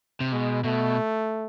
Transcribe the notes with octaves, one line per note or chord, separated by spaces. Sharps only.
C3
B2 G#3
B2 A3